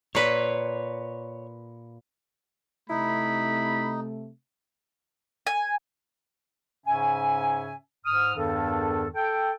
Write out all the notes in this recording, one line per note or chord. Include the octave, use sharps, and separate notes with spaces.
A#2 B4 C#5
C3 A3 D#4 E4 B5
G#5
G#2 C#3 C#4 E5 G#5
G#2 D#6 F6
E2 G2 D#3 A4
A4 G5